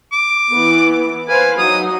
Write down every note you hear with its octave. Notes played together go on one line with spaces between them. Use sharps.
D6
E3 B3
B4 C5 F5 G#5
F#3 D#4 D#6